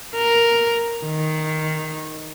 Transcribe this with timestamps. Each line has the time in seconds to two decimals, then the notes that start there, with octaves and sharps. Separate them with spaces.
0.15 A#4
1.05 D#3